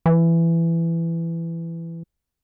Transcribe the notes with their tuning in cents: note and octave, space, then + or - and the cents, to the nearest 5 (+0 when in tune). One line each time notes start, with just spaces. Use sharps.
E3 +15